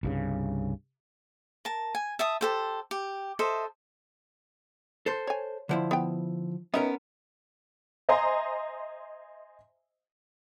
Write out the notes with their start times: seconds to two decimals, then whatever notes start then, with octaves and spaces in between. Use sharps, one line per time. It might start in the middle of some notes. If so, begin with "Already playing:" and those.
0.03 C2 G2 C#3
1.65 A#4 A5
1.95 G#5
2.19 E5 A5 D#6
2.41 G4 A4 C5
2.91 G4
3.39 A4 C5 D#5 E5
5.06 A4 C5
5.27 C#5 G#5
5.69 D3 F3 E4
5.91 B3 G5
6.74 B3 C#4 D#4 A#4 B4 E5
8.09 C5 D#5 E5 G#5 A#5 C6